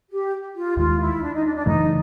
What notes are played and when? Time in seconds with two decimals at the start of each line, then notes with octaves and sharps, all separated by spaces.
0.11 G4
0.55 F4
0.77 D#2 D#3 G#3 F4
0.99 E4
1.21 D4
1.33 D#4
1.44 D4
1.55 D4
1.66 F#2 C#3 E3 A3 D#4